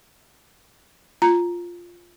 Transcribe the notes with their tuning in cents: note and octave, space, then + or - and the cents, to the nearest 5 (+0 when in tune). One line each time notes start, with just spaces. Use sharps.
F4 +0 A#5 +0